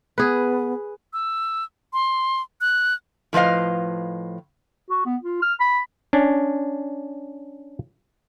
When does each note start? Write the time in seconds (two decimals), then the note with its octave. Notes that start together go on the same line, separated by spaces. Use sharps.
0.18 B3 G#4 B4
1.13 E6
1.93 C6
2.61 F#6
3.33 A2 F3 B4 D#5 F5
4.90 F#4
5.05 B3
5.22 F4
5.42 F6
5.60 B5
6.13 C#4 D4